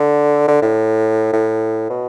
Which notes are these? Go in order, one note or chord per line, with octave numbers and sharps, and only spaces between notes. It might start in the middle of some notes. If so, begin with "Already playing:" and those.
Already playing: D3
D3
A2
A2
B2